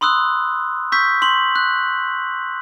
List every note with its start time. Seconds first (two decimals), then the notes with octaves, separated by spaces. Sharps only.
0.01 B5 C6 D#6 E6 F#6
0.92 C#6 E6 G6 B6
1.22 C6 F#7
1.56 F#6